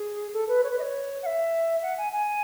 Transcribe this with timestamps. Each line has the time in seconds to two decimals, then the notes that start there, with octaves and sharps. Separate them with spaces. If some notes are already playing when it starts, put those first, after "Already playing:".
Already playing: G#4
0.33 A4
0.48 B4
0.63 C#5
0.70 B4
0.78 D#5
0.82 C#5
1.22 F#5
1.26 E5
1.82 F#5
1.97 G#5
2.12 G#5